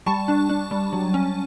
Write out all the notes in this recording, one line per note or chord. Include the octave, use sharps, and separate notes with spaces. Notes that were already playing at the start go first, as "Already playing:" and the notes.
G3 A5 C#6
D4
D4
G3
F#3
C#4